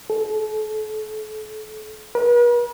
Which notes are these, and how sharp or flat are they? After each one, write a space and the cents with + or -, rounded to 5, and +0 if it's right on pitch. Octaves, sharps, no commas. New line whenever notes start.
A4 -35
B4 -45